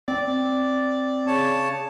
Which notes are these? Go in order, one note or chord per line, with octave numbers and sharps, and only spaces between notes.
C4 D5
C#3 C#5 A5